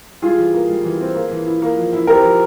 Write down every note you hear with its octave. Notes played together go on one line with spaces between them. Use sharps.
G3 F4 G#4
E3
A#3
G3
E3
C4
A#3
E3
E4
A#3
F3
E4
C4 G4 A#4
F3